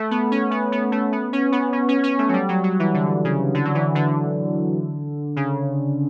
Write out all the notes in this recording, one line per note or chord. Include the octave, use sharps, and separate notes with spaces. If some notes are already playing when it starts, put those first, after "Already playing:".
Already playing: A3
B3
C#4
B3
B3
A3
B3
C#4
B3
C#4
C#4
C#4
A3
F#3
G3
F#3
F#3
E3
D3
C#3
D3
F#3
E3
D3
C#3